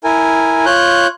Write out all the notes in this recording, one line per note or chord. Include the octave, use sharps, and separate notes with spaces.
E4 A#4 G#5
F4 C#5 F#6 G6